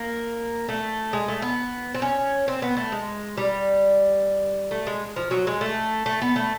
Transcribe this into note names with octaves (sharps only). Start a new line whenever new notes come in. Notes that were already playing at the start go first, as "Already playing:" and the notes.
Already playing: A#3
A3
G#3
A3
B3
C4
C#4
C4
B3
A3
G#3
G3
A3
G#3
F3
F#3
G#3
A3
A3
B3
A3